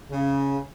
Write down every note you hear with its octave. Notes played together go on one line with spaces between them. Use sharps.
C#3